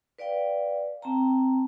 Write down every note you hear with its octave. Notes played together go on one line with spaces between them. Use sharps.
B4 D5 F5 G5
C4 G5 A5 A#5